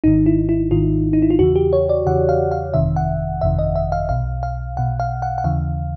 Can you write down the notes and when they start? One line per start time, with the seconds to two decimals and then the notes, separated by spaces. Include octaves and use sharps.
0.04 G#1 G#2 D#3 D#4
0.26 E4
0.49 E4
0.71 G#1 G#2 D#3 F4
1.13 D#4
1.22 E4
1.30 F4
1.39 E2 C#3 E3 F#4
1.56 G4
1.73 C#5
1.89 D5
2.06 E2 C#3 E3 F#5
2.29 F5
2.51 F5
2.74 G1 F2 C3 D#3 E5
2.96 F#5
3.41 G1 F2 C3 D#3 E5
3.59 D#5
3.76 E5
3.92 F5
4.09 B1 B2 F5
4.43 F5
4.77 B1 B2 F#5
5.00 F5
5.22 F#5
5.38 F#5
5.44 D#2 C#3 E3 F5